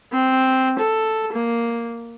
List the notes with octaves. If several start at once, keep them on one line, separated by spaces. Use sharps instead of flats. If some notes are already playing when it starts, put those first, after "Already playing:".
C4
A4
A#3